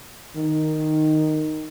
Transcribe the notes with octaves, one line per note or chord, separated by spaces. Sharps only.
D#3